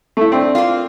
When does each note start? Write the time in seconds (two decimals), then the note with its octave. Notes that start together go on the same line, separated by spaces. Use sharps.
0.17 A3 E4
0.32 C4 D4
0.55 A#3 F4